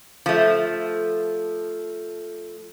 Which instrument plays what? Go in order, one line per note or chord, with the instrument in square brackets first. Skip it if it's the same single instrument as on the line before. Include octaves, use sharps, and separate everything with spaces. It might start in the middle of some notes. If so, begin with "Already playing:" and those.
[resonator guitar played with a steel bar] F3 A3